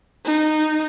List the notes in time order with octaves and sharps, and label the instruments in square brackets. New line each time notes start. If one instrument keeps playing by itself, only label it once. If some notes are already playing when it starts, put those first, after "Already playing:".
[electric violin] D#4